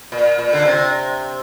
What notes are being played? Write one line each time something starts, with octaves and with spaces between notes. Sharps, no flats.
A#2
A#2
D3
C3